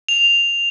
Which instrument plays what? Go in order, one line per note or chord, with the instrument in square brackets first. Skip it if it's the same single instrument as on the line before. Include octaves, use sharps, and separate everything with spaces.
[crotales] F7